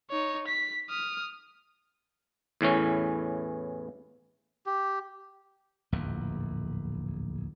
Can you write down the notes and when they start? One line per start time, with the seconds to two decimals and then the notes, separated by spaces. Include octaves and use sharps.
0.11 D#4 C#5
0.47 B6
0.90 D#6 F6
2.61 E2 A2 E3 C#4
4.66 G4
5.92 D1 A#1 E2